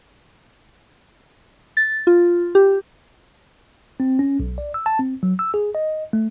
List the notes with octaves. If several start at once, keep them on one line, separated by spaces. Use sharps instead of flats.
A6
F4
G4
C4
C#4
B1
D5
E6
A5
C4
F#3
E6
G#4
D#5
A3